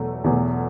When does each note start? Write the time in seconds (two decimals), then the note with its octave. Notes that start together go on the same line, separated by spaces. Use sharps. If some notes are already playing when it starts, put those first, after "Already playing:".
Already playing: E2 B2 F#3 A3
0.24 E2 B2 F#3 A3